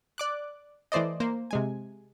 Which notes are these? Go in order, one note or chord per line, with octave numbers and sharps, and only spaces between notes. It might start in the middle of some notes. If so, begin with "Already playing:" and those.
D5 D6 F#6
E3 A3 C5 D5 D#5
A#3 C5
C3 G#3 G#5